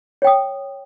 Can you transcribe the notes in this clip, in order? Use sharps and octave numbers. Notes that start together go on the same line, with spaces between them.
C#5 G5 D#6